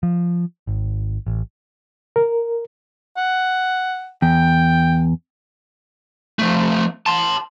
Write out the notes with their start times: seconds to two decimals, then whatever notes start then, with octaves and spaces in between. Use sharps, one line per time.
0.03 F3
0.67 G#1
1.27 A1
2.16 A#4
3.17 F#5
4.22 E2 G5
6.39 F3 A3
7.06 A5 C6